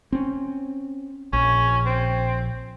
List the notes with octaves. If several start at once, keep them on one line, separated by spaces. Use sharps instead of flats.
C4 C#4
A#1 C#4
C4